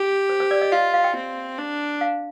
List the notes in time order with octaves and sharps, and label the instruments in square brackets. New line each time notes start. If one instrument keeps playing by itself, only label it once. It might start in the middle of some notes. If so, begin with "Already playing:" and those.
Already playing: [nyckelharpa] G4
[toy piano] C5
C5
D5
D#5
[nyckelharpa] F4 [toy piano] F5
[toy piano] F5
G5
[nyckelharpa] C4
D4
[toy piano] F5